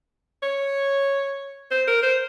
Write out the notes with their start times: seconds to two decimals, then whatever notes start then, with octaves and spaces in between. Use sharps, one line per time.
0.43 C#5
1.71 C5
1.87 A#4
2.03 C5